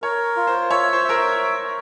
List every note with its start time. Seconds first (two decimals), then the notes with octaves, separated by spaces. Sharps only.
0.02 A#4 C#5
0.36 F4
0.47 C5
0.70 C#5 E5
0.93 C5
1.04 A#4 E5
1.16 C5